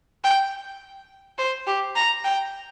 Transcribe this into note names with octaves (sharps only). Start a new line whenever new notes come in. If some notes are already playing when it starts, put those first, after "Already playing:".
G5
C5
G4
A#5
G5